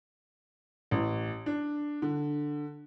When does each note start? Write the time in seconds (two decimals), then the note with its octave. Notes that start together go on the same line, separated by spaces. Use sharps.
0.91 A1
1.46 D4
2.02 D3